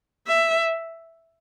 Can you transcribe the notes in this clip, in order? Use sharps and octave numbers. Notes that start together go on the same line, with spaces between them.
E5